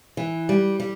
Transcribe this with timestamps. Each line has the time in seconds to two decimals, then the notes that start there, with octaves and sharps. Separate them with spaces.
0.17 E3
0.49 G3
0.80 G3